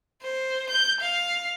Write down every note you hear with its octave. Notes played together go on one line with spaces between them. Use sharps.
C5
G6
F5